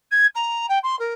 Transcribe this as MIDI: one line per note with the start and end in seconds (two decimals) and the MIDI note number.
0.11 0.26 92
0.35 0.66 82
0.68 0.78 79
0.83 0.98 84
0.99 1.13 70